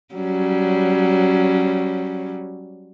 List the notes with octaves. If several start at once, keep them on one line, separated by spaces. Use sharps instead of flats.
F#3 G3 C#4